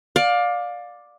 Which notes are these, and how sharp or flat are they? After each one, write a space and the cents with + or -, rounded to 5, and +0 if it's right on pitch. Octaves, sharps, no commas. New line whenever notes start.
D5 +5 F5 +25